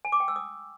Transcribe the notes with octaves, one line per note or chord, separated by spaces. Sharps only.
G#5
D6
G5
E6
D#6